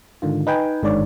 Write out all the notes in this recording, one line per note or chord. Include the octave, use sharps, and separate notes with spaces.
G#2 D3 D#3 F4
D#4 B4 G5 G#5
G1 G#2 D#3 D4 C#5 D5